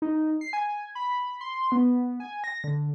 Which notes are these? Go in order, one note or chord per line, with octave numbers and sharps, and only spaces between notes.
D#4
C7
G#5
B5
C6
B3
G#5
A#6
D3